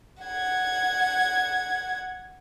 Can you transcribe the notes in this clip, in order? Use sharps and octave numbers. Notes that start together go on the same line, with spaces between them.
F#5 G#6